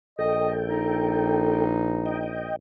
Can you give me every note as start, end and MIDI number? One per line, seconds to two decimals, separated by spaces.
0.19 2.53 34
0.19 1.65 69
0.19 0.50 75
0.19 1.65 79
0.68 2.42 63
2.06 2.56 75
2.06 2.56 79